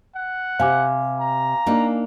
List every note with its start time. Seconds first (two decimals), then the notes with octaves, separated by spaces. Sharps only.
0.15 F#5
0.60 C3 F5 G#5 D6
1.20 A#5
1.66 A#3 D4 D#4